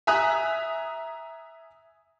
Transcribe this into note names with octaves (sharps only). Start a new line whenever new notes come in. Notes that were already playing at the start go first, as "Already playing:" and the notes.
E5 G#5 A#5 D#6 F#6